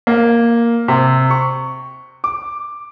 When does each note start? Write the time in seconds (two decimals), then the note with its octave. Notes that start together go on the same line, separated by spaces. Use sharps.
0.07 A#3
0.88 C3
1.30 C#6
2.24 D6